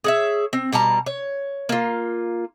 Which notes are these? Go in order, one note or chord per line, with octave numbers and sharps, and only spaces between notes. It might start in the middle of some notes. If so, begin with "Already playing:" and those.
G#4 C#5 E5
C4
B2 G3 A5 A#5
C#5
A#3 F4